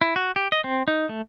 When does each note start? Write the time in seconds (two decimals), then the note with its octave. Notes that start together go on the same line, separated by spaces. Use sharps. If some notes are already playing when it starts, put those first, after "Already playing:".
0.01 E4
0.16 F#4
0.36 G4
0.52 D#5
0.64 C4
0.88 D#4
1.09 A3